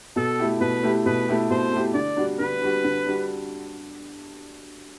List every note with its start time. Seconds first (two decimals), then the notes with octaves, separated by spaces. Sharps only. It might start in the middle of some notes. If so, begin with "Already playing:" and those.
0.16 B2 A4
0.39 A3 E4 G4
0.60 B2 B4
0.83 A3 E4 G4
1.06 B2 B4
1.28 A3 E4 G4
1.50 B2 C5
1.72 A3 E4 G4
1.94 D3 D5
2.17 G3 D4 F#4
2.39 D3 B4
2.61 G3 D4 F#4
2.84 D3
3.06 G3 D4 F#4